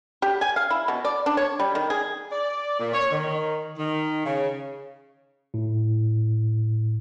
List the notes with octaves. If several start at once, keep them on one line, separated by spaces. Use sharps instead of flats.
G4
G#5
F5
E4
B2
D5
D4
C#5
G3
D#3
G#4
D5
A#2
C#5
D#3
D#3
C#3
A2